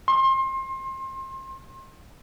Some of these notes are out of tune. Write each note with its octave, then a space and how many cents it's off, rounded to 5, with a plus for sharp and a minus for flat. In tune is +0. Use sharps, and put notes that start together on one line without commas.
C6 +30